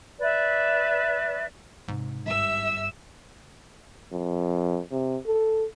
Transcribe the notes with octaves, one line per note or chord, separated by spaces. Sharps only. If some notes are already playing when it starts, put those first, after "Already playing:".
B4 D5 E5
G#2 C3
G1 G2 E5 E6
F2
C3
A4